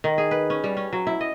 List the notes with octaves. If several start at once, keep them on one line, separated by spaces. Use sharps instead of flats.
D#3
G#4
B4
C#4
G3
C#4
F#3
E4
D#5